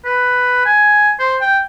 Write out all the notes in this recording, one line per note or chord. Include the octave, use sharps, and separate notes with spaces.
B4
G#5
C5
G5